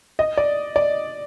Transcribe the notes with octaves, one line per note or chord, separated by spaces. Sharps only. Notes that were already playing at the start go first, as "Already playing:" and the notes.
D#5
D5
D5